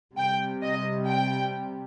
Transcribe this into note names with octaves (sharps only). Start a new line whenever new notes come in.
C3 G3 G5
D#5
G5